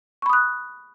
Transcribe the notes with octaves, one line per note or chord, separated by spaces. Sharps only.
B5 C#6 D#6 F#6